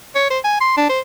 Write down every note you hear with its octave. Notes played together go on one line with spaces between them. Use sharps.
C#5
C5
G#5
C6
D4
C5